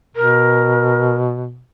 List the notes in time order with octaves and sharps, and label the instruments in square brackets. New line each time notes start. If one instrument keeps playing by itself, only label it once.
[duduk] B2 [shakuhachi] A#4